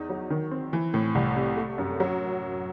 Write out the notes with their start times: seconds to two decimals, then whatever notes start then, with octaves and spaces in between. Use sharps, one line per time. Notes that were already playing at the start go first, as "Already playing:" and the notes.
Already playing: E2 D#4
0.09 F#3
0.30 D#3
0.51 C4
0.73 E3
0.94 A2
1.15 C2
1.36 C3
1.57 A3
1.78 F#2
2.00 F#3